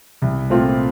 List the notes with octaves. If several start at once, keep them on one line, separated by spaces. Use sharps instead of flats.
C2
A#2 A3 C4 F4